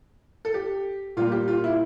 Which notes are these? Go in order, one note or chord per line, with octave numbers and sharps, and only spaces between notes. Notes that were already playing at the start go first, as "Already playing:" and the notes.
A4
G4
A#2 G3 A#3 F4
G4
F4
E4